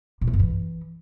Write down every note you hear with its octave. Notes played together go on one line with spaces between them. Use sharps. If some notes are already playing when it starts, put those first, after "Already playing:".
A#2
A3
F#2
E3